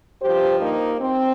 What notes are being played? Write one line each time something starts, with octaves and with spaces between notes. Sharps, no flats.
G2 F3 G4 C5
A#3 D#4
C4